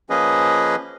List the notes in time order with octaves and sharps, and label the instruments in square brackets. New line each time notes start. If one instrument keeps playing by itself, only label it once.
[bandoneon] F3 A#3 C#4 G#4 B4 D#5